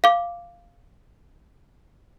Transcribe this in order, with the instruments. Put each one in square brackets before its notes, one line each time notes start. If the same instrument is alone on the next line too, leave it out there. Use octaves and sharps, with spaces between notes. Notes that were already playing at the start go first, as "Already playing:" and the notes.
[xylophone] F5 D6